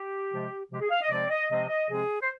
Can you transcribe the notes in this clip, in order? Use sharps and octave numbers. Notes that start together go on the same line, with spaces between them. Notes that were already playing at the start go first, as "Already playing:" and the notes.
Already playing: G4
C3 F3 G#3
C3 F3 G#3 G4
G#4
F5
D#5
C3 F3 G#3 C4 D5
D#5
C3 F3 G#3 C4 D#5
D#5
C3 F3 G#3 C4 G#4
C5